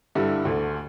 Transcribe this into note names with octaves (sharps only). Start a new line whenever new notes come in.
G2 D3 G3 E4
D2 D3 A3